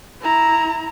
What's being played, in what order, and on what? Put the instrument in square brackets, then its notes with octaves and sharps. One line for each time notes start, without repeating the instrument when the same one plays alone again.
[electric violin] E4 A#5